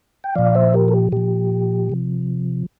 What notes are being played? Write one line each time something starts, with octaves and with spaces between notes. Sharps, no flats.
G5
A#2 F3 D5 F5
C5 E5
G4 A#4
A4
G4
A#2 F3 G4
C3 F3